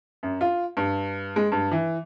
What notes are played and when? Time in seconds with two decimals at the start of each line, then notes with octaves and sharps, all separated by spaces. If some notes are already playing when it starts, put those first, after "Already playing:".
0.23 F#2
0.41 F4
0.77 G2
1.36 G#3
1.52 G2
1.71 E3